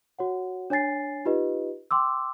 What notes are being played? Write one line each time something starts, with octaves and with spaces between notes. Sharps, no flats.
F#4 C#5 F#5
D4 C#5 G#5 A6 C7
D#4 F4 G4 B4 D#5
G5 C6 D6 E6